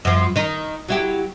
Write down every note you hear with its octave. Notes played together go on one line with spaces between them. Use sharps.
F#2 F3
D#3 D#4
F#3 E4 G4